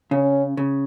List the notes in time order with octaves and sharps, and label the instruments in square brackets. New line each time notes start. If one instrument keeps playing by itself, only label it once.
[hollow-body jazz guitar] C#3 [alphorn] C#4
[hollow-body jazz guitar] C#3